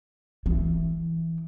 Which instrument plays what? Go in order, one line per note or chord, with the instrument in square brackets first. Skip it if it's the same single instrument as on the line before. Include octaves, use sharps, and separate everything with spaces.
[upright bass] E3